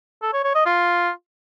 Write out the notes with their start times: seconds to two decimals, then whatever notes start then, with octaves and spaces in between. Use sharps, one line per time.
0.22 A4
0.33 C#5
0.44 C#5
0.55 D#5
0.66 F4